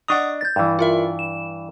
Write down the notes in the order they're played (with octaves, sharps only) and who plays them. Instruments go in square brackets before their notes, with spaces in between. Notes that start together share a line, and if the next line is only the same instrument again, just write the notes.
[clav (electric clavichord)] D4 D#5 A#5 [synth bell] F#5 C#6 D#6
[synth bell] G6 A6
[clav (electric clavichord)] G2 E3
[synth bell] F4 A#4 E5
E7